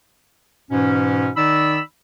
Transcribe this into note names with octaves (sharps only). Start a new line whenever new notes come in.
G#2 B2 E3 C#4
D#3 D#4 D5 B5 E6